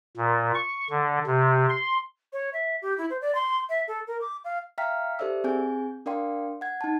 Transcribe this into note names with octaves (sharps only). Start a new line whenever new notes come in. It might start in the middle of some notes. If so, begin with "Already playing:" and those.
A#2
C#6
D3
C3
C6
C#5
E5
G4
E4
C5
D5
C6
E5
A4
A#4
D6
F5
E5 F5 G5 A#5 F6 B6
G4 A4 C5 D5 E5 E6
C4 G#4 G#5 G6
D4 A#4 D5 F5 G5 C6
F#5 G#6
D#4 A5